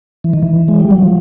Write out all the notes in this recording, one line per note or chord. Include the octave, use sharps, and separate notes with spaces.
E3
D#3
E3
G#3
G3
F#3
F3